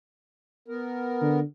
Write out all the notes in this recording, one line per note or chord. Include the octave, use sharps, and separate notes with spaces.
B3 A#4
D3